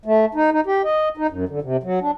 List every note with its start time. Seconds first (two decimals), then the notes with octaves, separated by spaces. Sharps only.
0.05 A3
0.35 D#4
0.52 D#4
0.66 G4
0.84 D#5
1.17 D#4
1.30 F#2
1.49 D3
1.62 C3
1.83 F#3
2.01 D4